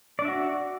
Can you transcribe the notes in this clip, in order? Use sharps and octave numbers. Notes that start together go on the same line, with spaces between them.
D4 F#4 D5 E5